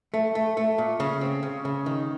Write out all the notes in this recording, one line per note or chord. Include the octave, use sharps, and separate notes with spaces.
A3
A3
A3
A#2
C#3
C4
C#3
C#3
D#3